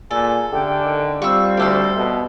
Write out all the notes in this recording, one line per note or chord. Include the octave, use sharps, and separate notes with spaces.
A#2 G#4 A4
D3 A3 C#4 G4 G5
D#3
G3 C4 F4 C#6 E6
D2 G4 A4 C6
B2 A3